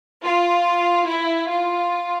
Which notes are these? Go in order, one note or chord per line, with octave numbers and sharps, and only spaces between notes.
F4
E4
F4